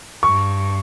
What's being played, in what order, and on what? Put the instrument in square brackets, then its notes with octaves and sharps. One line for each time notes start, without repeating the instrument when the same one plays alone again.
[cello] G2 [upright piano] C#6